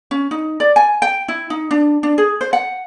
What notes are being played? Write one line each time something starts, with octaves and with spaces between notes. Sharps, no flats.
C#4
D#4
D5
G#5
G5
E4
D#4
D4
D4
G#4
C5
F#5